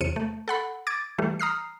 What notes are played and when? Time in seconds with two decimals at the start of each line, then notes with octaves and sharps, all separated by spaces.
0.01 E2 C3 C#7 D#7
0.16 A3
0.48 A4 F#5 B5
0.87 D6 G#6 A6 D7
1.18 E3 G3 A3
1.39 A#5 D#6 F6 C7